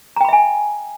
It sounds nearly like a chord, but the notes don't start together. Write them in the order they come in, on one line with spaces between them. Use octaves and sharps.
A#5 G5 B5 E5 G#5